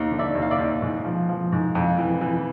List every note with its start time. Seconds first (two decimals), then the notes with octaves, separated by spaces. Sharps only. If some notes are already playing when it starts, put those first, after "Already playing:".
Already playing: D#2
0.11 D3
0.19 D5 E5
0.35 D#2
0.42 F5
0.51 D5 E5
0.58 D#2
0.82 G#2
1.05 F3
1.29 F3
1.52 G#2
1.75 F2
1.98 E3
2.21 E3